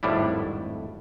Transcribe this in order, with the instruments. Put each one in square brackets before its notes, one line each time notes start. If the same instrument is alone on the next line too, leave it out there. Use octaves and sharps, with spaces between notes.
[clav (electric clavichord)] G#1 F2 A2 G3 D4 E4